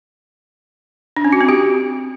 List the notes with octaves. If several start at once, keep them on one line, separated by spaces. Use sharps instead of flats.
D4
C#4
F#4
C4
G4